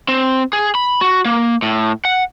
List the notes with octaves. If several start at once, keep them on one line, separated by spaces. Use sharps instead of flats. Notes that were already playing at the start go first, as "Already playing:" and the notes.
C4
G#4
B5
F#4
A#3
A2
F#5